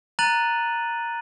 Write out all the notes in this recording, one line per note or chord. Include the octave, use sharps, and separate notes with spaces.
A#5 F#6 A6 D#7 F#7